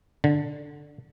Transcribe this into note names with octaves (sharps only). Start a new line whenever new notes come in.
D3